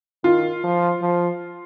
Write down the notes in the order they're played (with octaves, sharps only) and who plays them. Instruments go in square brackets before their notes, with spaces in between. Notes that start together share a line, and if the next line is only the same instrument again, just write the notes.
[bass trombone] D#3 [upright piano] F4
[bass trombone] F3
F3